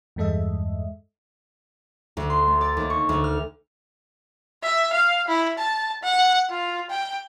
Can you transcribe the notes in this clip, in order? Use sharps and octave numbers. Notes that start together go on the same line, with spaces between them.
E2 G2 G#3 A4 D#5 E5
D2
C6
A3
D5
D#2
C#6
D2
F6
E5
F5
E4
A5
F#5
F4
G5